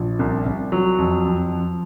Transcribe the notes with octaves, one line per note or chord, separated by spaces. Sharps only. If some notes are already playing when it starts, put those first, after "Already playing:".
Already playing: A#1
C2
C2
F#3
F2
F2
F3